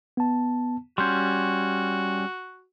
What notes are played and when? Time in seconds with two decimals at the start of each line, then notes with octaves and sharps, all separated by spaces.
0.17 B3 A5
0.98 G3 C#4 F#4 C6 G6